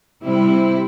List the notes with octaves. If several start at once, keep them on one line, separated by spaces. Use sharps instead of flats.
C3 G3 C4 E4